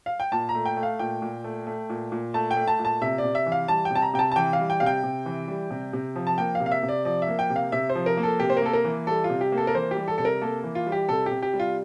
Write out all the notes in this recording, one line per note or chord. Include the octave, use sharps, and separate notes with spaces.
F5
G5
A#2 A5
A#5
A3
G5
A3
F5
A#2 G5
A#2
A3
A3
A#2
A#2
A3 A5
G5
A3
A5
A#2
A5
C3 E5
D5
C3
E5
E3
F5
G3 A5
G5
C3 A5
A#5
C3 G5
A5
A5
E3 G5
F5
G3
G5
C3 F5
G5
C3
E3
G3
C3
C3
F3
A5
A#3 G5
F5
C3
F5
E5
C3
D5
F3 D5
E5
A#3
G5
C3
F5
C3 E5
C5
F3
A#4
A#3
A4
C3 G4
C5
A#4
A#3 A4
A#4
E3
G3 A4
F4
C3
G4
A#3
A4
A#4
E3 C5
G4
G3
A4
C3 A4
A#4
A#3 A4
E3
F4
G3
G4
C3 A4
G4
C3
G4
G3
F4